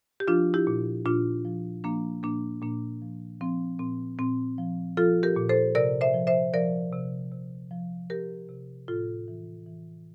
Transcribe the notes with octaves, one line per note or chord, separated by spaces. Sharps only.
G4
F3 D4 F4
E4 G4
A#2
A#2 D4 F4
F3
F3 A#3 D4
A#2 A#3 D4
A#2 A#3 D4
F3
F3 C4
A#2 C4
A#2 C4
F3
F3 F4 A4
G4 A#4
A#2
A4 C5
C3 A#4 D5
C5 E5
F3
C5 E5
F3 A#4 D5
C3
C3
F3
F3 G4 A#4
C3
A2 F4 A4
E3
E3